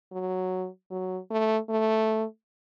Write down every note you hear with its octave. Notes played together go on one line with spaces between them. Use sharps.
F#3
F#3
A3
A3